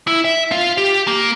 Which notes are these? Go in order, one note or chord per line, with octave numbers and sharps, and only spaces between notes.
E4
E5
F4
G4
A#3